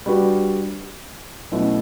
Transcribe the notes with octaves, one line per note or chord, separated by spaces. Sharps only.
G3 D4 F#4 B4
B2 F#3 A3 C#4 E4